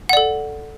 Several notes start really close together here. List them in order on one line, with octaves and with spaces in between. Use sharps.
F#5 D5 A4